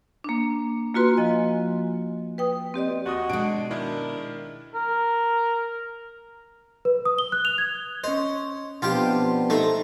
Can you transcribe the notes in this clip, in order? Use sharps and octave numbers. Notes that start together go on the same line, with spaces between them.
A#3 D4
A#3 F4 F#4 B4 C6
F3 D#5 G#5
B4 G5 D#6
C4 G4 D5 D#5
D#2 F#4 D#5 D#6
B2 G#3 D4 D7
D#3 D4 E4 A#4
A#4
B4
D#6
G7
F#6
F7
G#6
C#4 C5 D#5
B2 F3 B3 C4 D4 F4 G4
A3 D#4 A4 C5